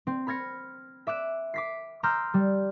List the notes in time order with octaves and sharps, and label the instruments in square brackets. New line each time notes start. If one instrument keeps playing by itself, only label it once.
[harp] C4
B5 F6 G#6 A#6 C#7
E5 D6 F#6 E7
D6 B6 C7
A#5 C6 D6 E6 F6 G6
G3